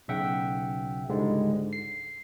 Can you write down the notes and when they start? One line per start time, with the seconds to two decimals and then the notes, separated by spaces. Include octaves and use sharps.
0.08 B1 C#3 E5 F#5 G5
1.09 C#2 G#2 D3 G3 G#3
1.73 C7